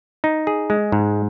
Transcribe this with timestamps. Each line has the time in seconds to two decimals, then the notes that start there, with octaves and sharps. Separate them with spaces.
0.24 D#4
0.47 G#4
0.70 G#3
0.92 G#2